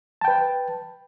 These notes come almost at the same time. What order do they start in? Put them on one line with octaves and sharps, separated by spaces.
A5 G5 B4